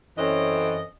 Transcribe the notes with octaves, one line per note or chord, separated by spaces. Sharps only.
F#2 E3 C4 C#4 A4 D#5